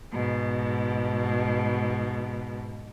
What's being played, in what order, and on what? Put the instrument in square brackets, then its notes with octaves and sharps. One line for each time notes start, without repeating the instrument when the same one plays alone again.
[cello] G#2 B2